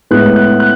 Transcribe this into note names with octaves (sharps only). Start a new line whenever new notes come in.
A2 G#3 B3 E4 F#6
F#6
F#6